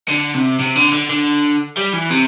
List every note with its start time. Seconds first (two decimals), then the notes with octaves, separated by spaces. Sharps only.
0.08 D3
0.34 C3
0.59 C3
0.76 D3
0.93 D3
1.10 D3
1.77 G3
1.93 E3
2.11 C3